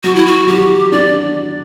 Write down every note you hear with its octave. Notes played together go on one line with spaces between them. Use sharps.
F#3 F#4
E4
F#4
F#3 G4
D4 D5